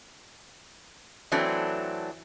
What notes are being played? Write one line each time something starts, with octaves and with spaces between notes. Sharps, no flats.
E3 F#3 A3 C4 D4